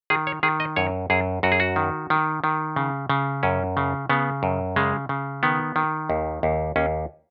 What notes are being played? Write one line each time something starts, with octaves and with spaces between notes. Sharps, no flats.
D#3 G#4
C#5
D#3 G#4
D#5
F#2 C#5
F#2 G#4
F#2 F#4
G#4
F#4
D#3
D#3
D#3
C#3
C#3
F#2 C#4
C#3
C#3 B3
F#2
C#3 G#3
C#3
D#3 B3
D#3
D#2
D#2
D#2 C#4